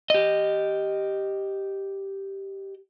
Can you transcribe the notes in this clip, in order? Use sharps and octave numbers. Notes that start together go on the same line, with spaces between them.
G4 D#5